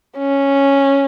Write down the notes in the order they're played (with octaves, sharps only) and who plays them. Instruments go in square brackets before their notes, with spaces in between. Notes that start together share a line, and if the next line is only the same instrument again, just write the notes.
[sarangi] C#4